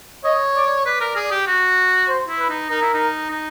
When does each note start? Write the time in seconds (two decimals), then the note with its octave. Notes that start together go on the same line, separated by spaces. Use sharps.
0.24 C#5 D#5
0.55 D5
0.86 B4 D5
1.00 A#4
1.16 G#4
1.31 G4
1.47 F#4
2.08 C5
2.28 E4
2.39 B4
2.49 D#4
2.70 D#4 A#4
2.82 E4
2.94 D#4
3.31 D#4